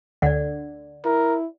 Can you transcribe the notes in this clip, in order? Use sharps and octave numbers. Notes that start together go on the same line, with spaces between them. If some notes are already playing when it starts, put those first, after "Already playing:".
D2 D3 D5 F#5
E4 A#4